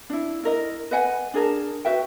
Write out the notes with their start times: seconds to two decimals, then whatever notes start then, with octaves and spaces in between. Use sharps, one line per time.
0.10 D4 E4
0.43 E4 A#4 D#5
0.91 B4 D#5 F#5 G#5
1.34 D4 G#4 A#4 A5
1.85 F#4 B4 E5 G5